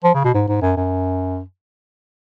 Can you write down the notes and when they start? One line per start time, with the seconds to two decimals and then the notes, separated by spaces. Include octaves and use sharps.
0.04 F3
0.14 C#3
0.24 B2
0.34 G#2
0.48 G#2
0.62 F#2
0.77 F#2